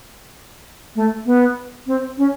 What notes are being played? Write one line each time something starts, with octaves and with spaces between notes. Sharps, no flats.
A3
B3
C4
C#4